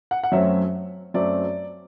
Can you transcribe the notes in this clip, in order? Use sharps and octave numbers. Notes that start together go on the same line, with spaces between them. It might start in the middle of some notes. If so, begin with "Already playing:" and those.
F#5
F#5
F#2 F#3 A3 C4 E5
F#2 F#3 A3 C4 D5